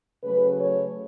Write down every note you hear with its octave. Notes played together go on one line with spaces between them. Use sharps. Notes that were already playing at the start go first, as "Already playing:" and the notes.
C#3 F#3 A3 B4
C#5